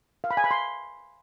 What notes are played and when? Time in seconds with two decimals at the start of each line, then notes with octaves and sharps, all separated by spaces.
0.24 F5
0.31 B5
0.37 G#5
0.44 B5
0.51 C6